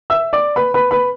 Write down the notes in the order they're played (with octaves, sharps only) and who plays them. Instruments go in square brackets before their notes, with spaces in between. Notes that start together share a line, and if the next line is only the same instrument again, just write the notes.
[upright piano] E5 E6
D5 D6
B4 B5
B4 B5
B4 B5